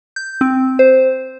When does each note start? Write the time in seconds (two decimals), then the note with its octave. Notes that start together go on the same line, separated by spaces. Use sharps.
0.16 G6
0.41 C4
0.79 C5